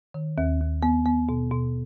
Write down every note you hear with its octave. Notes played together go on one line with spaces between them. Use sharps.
D#3
D#2
D#2
B3
B3
B2
B2